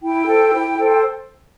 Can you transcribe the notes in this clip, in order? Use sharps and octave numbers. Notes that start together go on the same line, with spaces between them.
E4 G5
A4 C5
E4
A4 C5